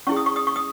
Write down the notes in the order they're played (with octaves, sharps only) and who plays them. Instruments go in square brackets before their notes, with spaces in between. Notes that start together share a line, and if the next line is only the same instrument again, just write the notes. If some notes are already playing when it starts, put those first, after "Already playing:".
[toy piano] C#4 E4 G#4 C#6
D#6
C#6
D#6
C#6
D#6